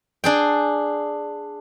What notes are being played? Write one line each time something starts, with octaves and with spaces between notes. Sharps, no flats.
D4 G#4 G5